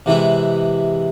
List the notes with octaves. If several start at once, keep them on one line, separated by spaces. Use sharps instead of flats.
C3 E3 G#3 E4